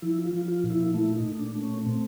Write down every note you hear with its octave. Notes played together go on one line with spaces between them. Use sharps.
F3 E4
F4
F3
F4
A#2
E4
A3 E4
D#4
A#2
D4
A3
C#4
C4